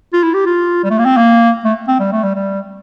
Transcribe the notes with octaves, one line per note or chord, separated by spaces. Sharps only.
F4
E4
G4
F4
G3
A3
A#3
C4
A#3
A3
C4
G3
A3
G3
G3